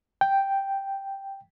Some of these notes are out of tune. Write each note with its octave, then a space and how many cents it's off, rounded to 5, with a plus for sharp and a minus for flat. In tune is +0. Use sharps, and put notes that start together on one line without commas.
G5 +0